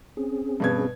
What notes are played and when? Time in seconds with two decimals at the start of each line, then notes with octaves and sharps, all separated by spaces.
0.17 C4 C#4 G#4
0.60 G2 B2 G#6